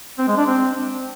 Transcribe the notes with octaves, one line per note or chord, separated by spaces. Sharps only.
C4
G#3
D4
C4